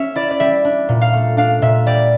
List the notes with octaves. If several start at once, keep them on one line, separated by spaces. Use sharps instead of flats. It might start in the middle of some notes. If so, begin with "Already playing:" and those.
Already playing: C#4 E5
E4 D5
D5
G3 E5
D4
A#2
F5
A3
D4 F5
A#2 E5
G3 D5